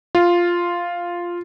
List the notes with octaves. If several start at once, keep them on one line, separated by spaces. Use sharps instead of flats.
F4